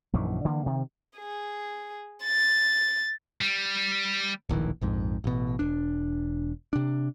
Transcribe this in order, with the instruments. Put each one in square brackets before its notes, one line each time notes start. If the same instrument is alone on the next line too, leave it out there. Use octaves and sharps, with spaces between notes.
[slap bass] A#1 F#2 D#3 E3
D3 E3 A#3
C3 D#3
[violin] G#4
A6
[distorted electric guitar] G3
[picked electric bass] D1 A#1 D#3 E3
A#1 F2 G#2
A1 B2
E1 D4
C3 D4